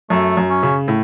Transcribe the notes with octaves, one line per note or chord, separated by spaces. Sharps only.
F#2 A3
F#2
C#4
C#3
A2